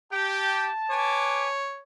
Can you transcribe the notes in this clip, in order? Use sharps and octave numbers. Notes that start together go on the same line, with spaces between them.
G4 G5 A5
B4 C#5 G#5 D6